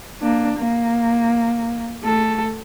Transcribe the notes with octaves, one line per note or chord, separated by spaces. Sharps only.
A#3 D4
A#3
A3 A4